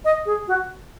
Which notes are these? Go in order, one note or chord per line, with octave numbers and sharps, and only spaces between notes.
D#5
G#4
F#4